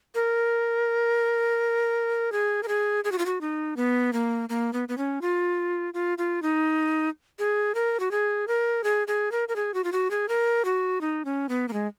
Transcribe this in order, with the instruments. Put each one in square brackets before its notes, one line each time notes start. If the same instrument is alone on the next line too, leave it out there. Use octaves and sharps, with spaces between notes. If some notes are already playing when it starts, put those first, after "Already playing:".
[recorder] A#4
G#4
A#4
G#4
G#4
F#4
F4
F#4
D#4
B3
A#3
A#3
B3
B3
C#4
F4
F4
F4
D#4
G#4
A#4
F#4
G#4
A#4
G#4
G#4
A#4
A#4
G#4
F#4
F4
F#4
G#4
A#4
F#4
D#4
C#4
B3
A#3
G#3